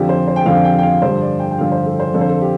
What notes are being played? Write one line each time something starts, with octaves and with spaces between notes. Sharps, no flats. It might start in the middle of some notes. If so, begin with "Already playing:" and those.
Already playing: F2 D3 F3 G4
C5
C5
G5
F2 D3 F3 F5
G5
G5
F5
G2 D3 F3 C5
D5
G5
G5
G2 D3 F3 F5
C5
A4
C5
F2 D3 F3 A4
C5
A4
G4